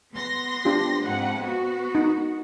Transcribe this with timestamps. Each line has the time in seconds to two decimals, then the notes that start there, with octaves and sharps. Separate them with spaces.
0.13 B3 C6 A#6
0.65 D4 F4 G4
1.04 F2 G#2 F#5
1.41 B3 F#4
1.95 D#4